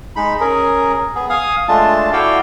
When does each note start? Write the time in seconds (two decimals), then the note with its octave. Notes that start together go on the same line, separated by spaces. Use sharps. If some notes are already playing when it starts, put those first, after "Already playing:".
0.16 G#3 D#4 B5
0.41 C#4 G#4 A#4
1.15 B3 G#4
1.30 F5 G#5 D#6
1.68 G#3 A3 D4 F4 A5
2.13 E4 F#4 A4 D5 F5 G5